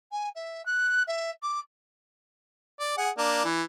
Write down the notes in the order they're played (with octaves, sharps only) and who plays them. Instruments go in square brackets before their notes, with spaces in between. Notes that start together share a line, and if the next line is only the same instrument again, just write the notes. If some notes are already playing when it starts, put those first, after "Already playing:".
[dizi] G#5
E5
F#6
E5
D6
[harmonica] D5
G#4 F#5
A#3 D4
E3